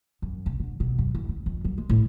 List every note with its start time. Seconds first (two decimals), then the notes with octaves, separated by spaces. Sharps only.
0.22 F#2
0.46 C3
0.60 D3
0.80 B2
0.99 F#2
1.15 E2
1.29 C#3
1.46 F2
1.65 F#3
1.78 G#3
1.89 A2